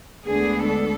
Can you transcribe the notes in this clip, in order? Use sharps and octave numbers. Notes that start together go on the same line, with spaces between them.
D2 D3 G#3 B3 D4 G#4
A4